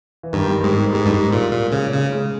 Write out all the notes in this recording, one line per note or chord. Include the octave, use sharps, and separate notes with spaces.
E3
G2 D#3
G3
G#2 G#3
G3
G#2 G#3
G2
G#2
A#2
A#2
C#3
C#3
G#3